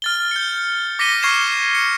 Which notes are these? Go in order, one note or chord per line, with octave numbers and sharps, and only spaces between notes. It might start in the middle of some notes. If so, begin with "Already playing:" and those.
F6 A6 G7
G6 C#7
D6 A#6 B6 C#7 D#7 G7
C#6 F6 G#6 C7 D#7 E7
C#7